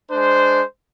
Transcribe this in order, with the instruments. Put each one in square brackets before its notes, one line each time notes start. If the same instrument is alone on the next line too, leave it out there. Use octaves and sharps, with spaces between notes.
[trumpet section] G#3 D4 C5